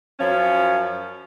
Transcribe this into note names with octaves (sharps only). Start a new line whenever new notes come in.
F#2 F3 C#4